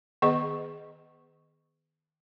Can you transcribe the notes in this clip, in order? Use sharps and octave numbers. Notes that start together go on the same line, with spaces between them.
D#3 B3 G#4 D#5 C#6